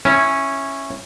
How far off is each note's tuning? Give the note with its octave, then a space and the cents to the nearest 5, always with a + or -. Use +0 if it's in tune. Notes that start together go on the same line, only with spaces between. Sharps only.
C#4 -10 E4 +0